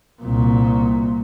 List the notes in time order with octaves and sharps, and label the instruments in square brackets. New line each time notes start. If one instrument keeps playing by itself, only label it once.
[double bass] C2 A#2